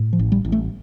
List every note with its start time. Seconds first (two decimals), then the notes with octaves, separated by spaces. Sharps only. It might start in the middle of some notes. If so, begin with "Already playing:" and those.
Already playing: A2
0.13 F3
0.19 A1
0.32 G3
0.45 A1
0.52 A3